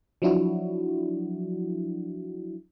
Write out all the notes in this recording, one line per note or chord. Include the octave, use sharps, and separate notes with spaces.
F3 F#3 D4 E4 F#4